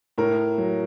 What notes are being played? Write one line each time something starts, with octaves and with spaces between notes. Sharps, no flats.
A2 A#4
F#3